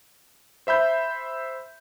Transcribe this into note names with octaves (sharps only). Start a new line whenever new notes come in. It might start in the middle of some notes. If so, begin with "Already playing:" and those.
C5 E5 B5 G6